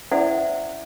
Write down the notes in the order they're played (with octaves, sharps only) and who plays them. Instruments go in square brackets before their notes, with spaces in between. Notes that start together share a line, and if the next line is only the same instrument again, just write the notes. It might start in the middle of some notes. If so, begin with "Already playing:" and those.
[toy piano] C#4 E4 C5 D5 E5 F#5